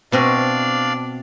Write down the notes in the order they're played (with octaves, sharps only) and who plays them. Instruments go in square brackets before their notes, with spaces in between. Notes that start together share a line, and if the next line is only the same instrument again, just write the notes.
[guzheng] B2 C4 D#5 [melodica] D4 D5 F5